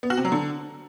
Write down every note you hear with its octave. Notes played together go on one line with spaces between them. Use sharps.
B3
F#4
C3
F#3
D3